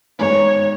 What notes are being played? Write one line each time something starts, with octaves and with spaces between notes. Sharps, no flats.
G#1 G#2 G#3 B3 D#4 C#5